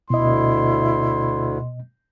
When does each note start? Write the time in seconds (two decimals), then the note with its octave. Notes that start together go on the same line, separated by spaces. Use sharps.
0.10 D2 B2 E4 D#5 C6